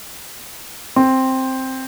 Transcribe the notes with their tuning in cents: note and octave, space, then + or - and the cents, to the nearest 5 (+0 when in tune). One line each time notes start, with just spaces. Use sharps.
C4 +5